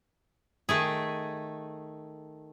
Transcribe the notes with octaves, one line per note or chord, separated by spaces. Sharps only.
D#3 A3 G#4